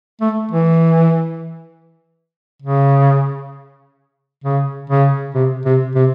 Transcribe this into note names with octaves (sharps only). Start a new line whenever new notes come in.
A3
E3
C#3
C#3
C#3
C3
C3
C3